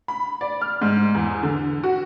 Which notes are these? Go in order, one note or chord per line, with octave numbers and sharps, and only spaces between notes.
B5
D5
F6
G#2
E2
D3
F#4